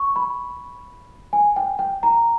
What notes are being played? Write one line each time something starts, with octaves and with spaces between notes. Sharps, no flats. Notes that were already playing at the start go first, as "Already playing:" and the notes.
Already playing: C#6
B5
G#5
G5
G5
A#5